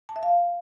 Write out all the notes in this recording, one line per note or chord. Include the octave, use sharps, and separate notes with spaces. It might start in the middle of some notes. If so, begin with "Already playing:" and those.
A5
E5
F5